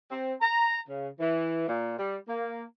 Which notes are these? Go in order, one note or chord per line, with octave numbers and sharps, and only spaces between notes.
C4
A#5
C#3
E3
A#2
G3
A#3